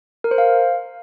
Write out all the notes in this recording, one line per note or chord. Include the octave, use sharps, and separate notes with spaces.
A#4
C5
F5